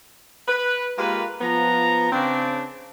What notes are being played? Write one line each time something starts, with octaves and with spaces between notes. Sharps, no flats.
B4
G#3 A#3 F4 G4 A#4 B4
F3 B3 A#5
C#3 C4 D4